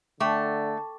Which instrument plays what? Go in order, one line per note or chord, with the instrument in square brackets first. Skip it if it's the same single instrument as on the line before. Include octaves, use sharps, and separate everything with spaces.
[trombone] D3 [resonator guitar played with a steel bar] A3 [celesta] G5 C#6 D6